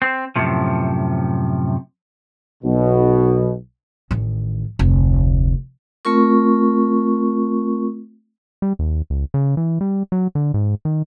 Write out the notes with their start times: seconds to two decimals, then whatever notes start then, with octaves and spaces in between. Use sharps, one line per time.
0.02 C4
0.36 F#2 A2 C3 F3
2.63 B1 B2
4.11 A1 D#3
4.79 F1 D2
6.05 A3 C4 F4 A#4 C#6
8.62 G3
8.79 D#2
9.10 C#2
9.34 C#3
9.57 E3
9.81 G3
10.12 F#3
10.35 D3
10.54 G#2
10.85 D#3